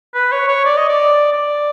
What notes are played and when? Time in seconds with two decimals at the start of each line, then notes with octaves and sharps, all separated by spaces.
0.14 B4
0.32 C#5
0.48 C#5
0.65 D5
0.77 D#5
0.89 D5
1.32 D5